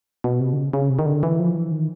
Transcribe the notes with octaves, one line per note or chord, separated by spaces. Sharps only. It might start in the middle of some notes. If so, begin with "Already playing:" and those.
B2
C3
D3
C#3
C#3
C3
D#3
D3
E3
F3
E3
D#3